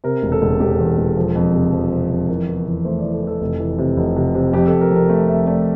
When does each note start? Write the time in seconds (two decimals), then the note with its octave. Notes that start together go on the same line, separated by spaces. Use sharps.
0.04 C3 A#4
0.23 E1
0.32 A4
0.42 E1
0.60 E1 G4
0.79 E2
0.98 E1
1.16 F3 A4
1.35 F2
1.54 C3
1.72 F3
1.91 C3
2.10 F2
2.29 E3 A#4
2.48 E2
2.66 E2
2.85 A3 C5
2.99 E3 D5
3.13 A4
3.22 E3
3.27 A4
3.41 F1
3.60 E3
3.78 C3
3.97 F1
4.16 C3
4.35 C3
4.53 F2 G4
4.67 A4
4.72 F2
4.81 A#4
4.90 F2
4.96 A#4
5.10 A3 E5
5.28 F2 E5
5.47 A3 D5